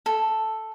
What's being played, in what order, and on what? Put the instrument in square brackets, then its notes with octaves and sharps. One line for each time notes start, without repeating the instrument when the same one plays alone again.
[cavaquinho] A4